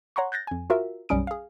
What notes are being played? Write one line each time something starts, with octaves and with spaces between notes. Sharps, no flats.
C#5 F#5 A#5 C6 C#6
F#6 G6 A6 A#6
F2 G#5
F4 F#4 A#4 E5
B1 F#2 G3 C#4 D#6 D7
G#4 F5